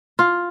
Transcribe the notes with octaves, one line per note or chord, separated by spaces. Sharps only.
F4